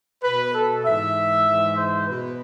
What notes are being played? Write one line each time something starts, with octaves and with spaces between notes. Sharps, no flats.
B2 B4
A4
G#2 E3 E5
G#2 E3
C5
B2 B4